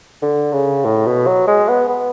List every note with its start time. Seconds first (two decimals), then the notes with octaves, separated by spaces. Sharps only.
0.22 D3
0.53 C#3
0.85 A2
1.06 B2
1.26 F#3
1.48 G#3
1.69 B3
1.89 B3